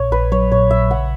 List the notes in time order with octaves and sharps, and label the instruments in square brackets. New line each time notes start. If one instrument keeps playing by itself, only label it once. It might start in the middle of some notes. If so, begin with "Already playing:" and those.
Already playing: [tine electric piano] A#1 A#2 [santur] C#5
[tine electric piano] A#1 [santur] B4
[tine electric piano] F#3 [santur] C#5
[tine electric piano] A#2 [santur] C#5
[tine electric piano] A#1 [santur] E5
[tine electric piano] C#3 [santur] F#5